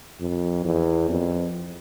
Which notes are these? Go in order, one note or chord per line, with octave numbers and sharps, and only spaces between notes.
F2
E2
F2